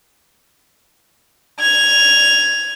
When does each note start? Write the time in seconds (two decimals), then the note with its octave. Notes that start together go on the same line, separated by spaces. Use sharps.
1.60 G#6 F7